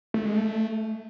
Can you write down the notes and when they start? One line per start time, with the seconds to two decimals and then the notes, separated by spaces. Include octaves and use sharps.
0.14 A3
0.25 G#3
0.36 A3